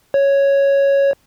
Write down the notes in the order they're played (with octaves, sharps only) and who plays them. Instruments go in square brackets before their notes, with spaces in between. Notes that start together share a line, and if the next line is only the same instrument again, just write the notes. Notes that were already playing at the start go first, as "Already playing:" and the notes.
[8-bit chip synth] C#5